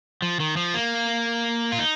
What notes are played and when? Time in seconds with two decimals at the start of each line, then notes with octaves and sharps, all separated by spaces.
0.22 F3
0.40 D#3
0.57 F3
0.74 A#3
1.72 F4
1.79 D#4